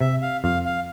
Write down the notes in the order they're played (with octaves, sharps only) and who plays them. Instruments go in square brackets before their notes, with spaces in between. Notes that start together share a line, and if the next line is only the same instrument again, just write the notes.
[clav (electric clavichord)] C3 [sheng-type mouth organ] E5
[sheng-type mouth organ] F5
[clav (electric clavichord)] F2 [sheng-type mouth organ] F5
[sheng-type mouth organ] F5